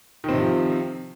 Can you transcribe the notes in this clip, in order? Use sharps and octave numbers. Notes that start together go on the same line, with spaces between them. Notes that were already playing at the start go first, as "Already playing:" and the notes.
C3 D#3 F3 C4